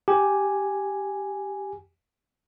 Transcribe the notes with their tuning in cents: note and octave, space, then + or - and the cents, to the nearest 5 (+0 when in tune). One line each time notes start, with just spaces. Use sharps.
G4 +0 G#5 +0